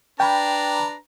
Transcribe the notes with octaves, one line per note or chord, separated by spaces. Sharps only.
D4 B4 G5 A#5 B5